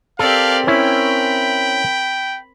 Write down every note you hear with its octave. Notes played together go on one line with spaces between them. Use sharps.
C4 G4 A4 A#4 D5 F5
C#4 E4 G5 B5